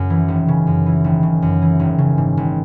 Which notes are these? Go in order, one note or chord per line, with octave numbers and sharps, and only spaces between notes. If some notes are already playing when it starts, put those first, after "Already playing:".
Already playing: F#2 C#3
E3
G#1
C#3
F#2
E3
G#1
C#3
F#2
E3
G#1
C#3
G#2
G#1